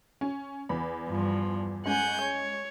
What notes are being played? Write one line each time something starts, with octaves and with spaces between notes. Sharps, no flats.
C#4
E2 B5
G2 F3
G#3 C#4 F#5 G#5 G6
C#5